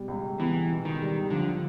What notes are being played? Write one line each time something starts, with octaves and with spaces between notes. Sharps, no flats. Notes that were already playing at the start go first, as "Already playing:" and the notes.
Already playing: B2 G3
C#2
E3 B3
B2
D#3
G3
D3 F3